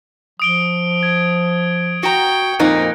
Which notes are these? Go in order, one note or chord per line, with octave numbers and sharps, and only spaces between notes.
F3 D#6 D7 G7
G#6
F#4 G5 A#5 C#7
F2 A#2 A#3 C4 D#4 F#6